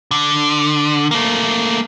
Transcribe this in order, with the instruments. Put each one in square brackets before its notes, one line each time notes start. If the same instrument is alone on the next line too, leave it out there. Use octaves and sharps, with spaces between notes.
[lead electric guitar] D3
A3 A#3